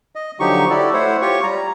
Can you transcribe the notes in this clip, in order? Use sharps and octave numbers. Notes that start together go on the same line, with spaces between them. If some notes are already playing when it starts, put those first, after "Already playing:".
D#5
D3 F3 F#3 D#4 G4 C#6
E4 F#4 G4 A4 D5
A3 E4 C5 C#5 F#5
F4 G4 C#5 C#6
G3 A#5